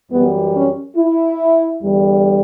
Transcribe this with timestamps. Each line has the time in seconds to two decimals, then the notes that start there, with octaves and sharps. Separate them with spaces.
0.11 F#2 E3 G3 B3
0.55 C#4
0.97 E4
1.83 E2 D3 G3